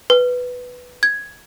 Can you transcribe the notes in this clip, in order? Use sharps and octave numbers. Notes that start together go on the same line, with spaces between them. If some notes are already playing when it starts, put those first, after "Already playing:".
B4
G#6